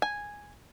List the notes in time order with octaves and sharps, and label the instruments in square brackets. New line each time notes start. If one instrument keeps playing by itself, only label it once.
[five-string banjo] G#5